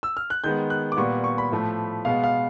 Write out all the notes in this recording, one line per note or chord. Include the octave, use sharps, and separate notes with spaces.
E6
F6
F#6
D#3 G#3 B3 G6
F#6
D6
A#2 G3 B3 C#6
C#6
B5
A2 F3 A3
B2 G#3 B3 F5
F5